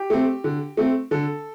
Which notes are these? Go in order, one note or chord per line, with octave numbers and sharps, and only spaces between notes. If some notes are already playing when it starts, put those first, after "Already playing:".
Already playing: G4
A3 C4
D3
A3 C4
D3 A4